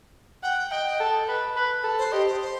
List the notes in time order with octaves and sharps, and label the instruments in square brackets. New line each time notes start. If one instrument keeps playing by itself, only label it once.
[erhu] F#5 [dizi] G5
[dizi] D#5 [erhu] G5
[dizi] D#5
[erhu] A4
B4
B4
A4
[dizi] C5
[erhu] G4 [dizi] D#5
[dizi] C5
C5